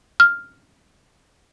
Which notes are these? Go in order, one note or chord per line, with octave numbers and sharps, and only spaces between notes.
F6